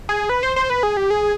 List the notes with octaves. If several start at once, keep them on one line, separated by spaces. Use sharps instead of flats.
G#4
B4
C5
C5
B4
G#4
G4
G#4